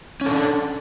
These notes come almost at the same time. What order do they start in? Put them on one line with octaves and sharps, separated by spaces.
C#4 A4 D4